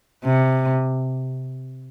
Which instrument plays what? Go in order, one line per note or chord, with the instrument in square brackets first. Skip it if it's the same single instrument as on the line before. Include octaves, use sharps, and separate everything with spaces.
[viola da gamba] C3